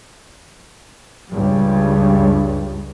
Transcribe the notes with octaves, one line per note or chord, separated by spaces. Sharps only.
C#2 G2 G3